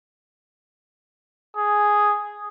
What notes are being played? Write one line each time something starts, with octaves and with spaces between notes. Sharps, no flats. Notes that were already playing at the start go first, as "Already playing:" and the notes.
G#4